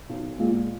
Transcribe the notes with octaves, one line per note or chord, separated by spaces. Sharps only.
B1
A#2 G#3